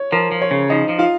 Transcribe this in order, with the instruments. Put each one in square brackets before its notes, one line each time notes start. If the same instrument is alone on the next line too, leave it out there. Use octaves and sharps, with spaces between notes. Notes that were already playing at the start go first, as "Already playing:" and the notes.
Already playing: [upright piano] C#5
[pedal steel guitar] F3 [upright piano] A#4
[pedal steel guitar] F3
[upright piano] C#5
[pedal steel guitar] C#3
[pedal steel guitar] F3 [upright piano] D#4 D#5
[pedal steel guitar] F3
[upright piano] F4 F5